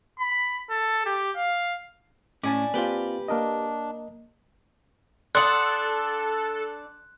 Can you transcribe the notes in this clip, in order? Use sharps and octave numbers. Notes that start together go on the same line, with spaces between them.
B5
A4
G4
F5
A2 C#4 D5 G#5 A5
A#3 C4 F4 G4 B4
A#3 D4 A#4 D#5
D4 A4 F#5 C6 D#6 F#6 F#7